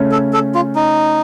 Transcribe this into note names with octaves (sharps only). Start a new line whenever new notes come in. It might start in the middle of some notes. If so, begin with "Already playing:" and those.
Already playing: C#3 A3 C#4
A4
A4
F4
D#4